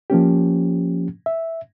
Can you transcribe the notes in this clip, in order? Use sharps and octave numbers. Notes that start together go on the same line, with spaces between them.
F3 A#3 C#4 G4
E5